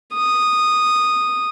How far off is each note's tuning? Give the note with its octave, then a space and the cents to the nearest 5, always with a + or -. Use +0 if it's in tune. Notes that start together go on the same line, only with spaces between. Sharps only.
D#6 -10